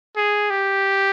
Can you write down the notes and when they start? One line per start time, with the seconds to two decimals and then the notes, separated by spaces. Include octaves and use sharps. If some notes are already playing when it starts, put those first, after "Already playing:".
0.17 G#4
0.50 G4